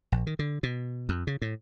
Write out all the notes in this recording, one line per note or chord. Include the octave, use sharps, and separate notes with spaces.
A#1
D#3
D3
B2
F2
C#3
A2